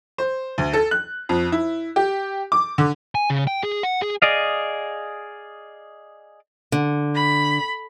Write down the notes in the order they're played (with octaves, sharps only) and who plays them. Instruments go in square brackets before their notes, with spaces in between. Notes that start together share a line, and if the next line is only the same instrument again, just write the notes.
[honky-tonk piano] C5
D2
A4
F#6
F2
E4
G4
D6
D3
[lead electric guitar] G#5
C#3
G5
G#4
F#5
G#4
[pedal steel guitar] G#4 D5 D#5 F5
[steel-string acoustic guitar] D3
[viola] B5